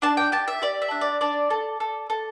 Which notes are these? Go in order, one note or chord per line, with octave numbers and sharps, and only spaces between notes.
D4 A5
G5
G4 A5
E5
G4 D5
E5
D4
D5
D4 D5
A4
A4
A4